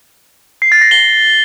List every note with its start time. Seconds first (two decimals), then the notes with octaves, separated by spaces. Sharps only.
0.62 C7
0.72 A6
0.81 A#6
0.91 G7